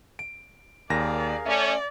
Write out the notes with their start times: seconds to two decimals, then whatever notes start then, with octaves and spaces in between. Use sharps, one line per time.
0.19 D7
0.90 D#2 G#4 A#4 D5 F5 A#6
1.46 A3 C#4 D5 E5